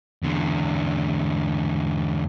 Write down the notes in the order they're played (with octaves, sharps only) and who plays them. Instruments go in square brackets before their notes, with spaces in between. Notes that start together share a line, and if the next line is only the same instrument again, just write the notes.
[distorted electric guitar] E2 D3